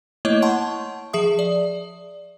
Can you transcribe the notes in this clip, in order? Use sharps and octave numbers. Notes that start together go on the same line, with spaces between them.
A3 A#3 E4 C#5 D#5
F#5 A5 C6 C#6
F3 G#4 E5 D#6
D5